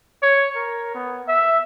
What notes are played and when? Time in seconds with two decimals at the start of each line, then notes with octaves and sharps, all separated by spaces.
0.22 C#5
0.56 A#4
0.95 B3
1.28 E5